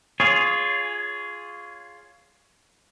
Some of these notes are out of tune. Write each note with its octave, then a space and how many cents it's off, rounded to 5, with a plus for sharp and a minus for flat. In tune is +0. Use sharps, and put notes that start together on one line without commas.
F4 +0 G#4 +0 C#5 +20